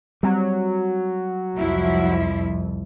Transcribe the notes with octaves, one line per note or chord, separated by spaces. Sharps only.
F#3 G3 C4
C2 F2 F3 E4